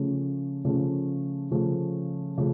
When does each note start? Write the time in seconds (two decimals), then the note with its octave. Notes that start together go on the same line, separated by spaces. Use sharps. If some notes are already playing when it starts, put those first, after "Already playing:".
Already playing: C#3 F3 A3 C#4
0.64 C#3 F3 A3 C#4
1.51 C#3 F3 A3 C#4
2.38 C#3 F3 A3 C#4